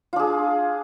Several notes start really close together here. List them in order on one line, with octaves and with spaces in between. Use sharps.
F4 D4 G#4